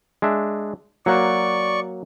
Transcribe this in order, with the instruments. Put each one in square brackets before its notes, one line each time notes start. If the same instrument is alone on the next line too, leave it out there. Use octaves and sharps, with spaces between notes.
[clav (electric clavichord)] G#3 D4 E5
[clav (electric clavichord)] F#3 A#3 F#5 [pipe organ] D5 C#6